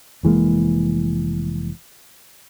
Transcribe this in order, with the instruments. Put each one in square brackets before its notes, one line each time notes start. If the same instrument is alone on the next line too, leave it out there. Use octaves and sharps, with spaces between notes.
[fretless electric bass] F1 E3 G#3 A#3